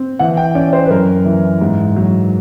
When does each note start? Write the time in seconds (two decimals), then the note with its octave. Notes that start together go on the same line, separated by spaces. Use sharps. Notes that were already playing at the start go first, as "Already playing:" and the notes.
Already playing: C4
0.19 E3 F#5
0.37 G5
0.55 C#4 D5
0.73 C5
0.85 B4
0.90 F#2 A#4
1.25 E3
1.61 G#2
1.96 F#3